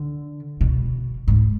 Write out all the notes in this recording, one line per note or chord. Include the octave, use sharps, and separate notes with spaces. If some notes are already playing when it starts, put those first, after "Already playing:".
Already playing: D3
B2
G#2